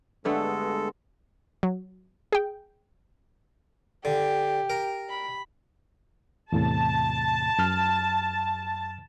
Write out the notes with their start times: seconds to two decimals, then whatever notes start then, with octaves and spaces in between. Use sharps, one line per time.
0.25 G2 D3 G#3 A3 B3 A4
1.63 F#3
2.32 G#4 G5
4.05 D3 G4
4.70 A#4
5.09 B5
6.52 E2 A2 C3 A5
7.59 F#2 F6